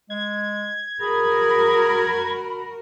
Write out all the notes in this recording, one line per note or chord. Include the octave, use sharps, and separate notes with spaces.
G#3 G#6
F#4 G#4 A#4 B5